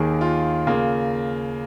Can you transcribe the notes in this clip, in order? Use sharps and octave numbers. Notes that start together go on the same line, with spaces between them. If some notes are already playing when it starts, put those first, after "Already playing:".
Already playing: D#2 D#3 A#3 G#4
F4
C#3 A#3